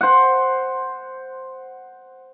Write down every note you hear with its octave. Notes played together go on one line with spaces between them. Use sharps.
C5 F#5